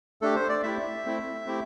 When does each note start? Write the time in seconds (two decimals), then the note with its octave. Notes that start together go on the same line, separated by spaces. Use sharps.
0.21 A3 D4 G4 A4
0.35 C5
0.49 D5
0.63 A3 E4 G4 E5
1.05 A3 C4 E4
1.46 A3 C4 E4 G4